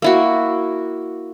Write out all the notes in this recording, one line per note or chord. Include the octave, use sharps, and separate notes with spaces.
A#3 E4 F#4